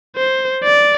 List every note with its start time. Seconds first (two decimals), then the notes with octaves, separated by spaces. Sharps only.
0.16 C5
0.64 D5